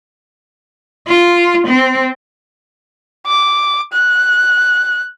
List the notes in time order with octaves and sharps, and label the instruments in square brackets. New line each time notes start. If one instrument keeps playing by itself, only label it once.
[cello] F4
C4
[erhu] D6
F#6